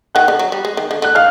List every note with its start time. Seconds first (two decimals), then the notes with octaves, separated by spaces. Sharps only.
0.15 D#3 F#5 F#6
0.28 D3
0.39 F#3
0.52 G3
0.65 G#3
0.77 D#3
0.91 D3
1.02 D3 F#6
1.15 D#3 F5 F6